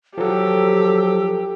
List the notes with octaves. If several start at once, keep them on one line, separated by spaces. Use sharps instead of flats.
F3 F#3 G4 A4